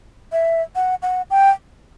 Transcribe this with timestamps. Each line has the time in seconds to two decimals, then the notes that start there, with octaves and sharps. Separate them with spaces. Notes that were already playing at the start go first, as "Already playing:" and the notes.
0.32 E5
0.76 F#5
1.02 F#5
1.30 G5